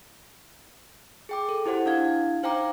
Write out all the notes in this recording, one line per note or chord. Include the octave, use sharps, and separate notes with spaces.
G#4 G5 D6
A4
E4 G4 C5 F#5
D4 E4 F5 G#6
D#4 C5 F5 G5 A#5 D6